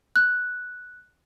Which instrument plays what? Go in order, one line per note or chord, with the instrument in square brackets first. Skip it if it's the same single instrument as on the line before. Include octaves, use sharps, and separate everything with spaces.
[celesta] F#6